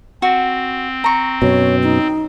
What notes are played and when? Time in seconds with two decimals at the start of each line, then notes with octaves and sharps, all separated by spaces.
0.22 C4 F#4
1.04 A#5 C#6
1.42 F#2 B2 C#5
1.83 D#4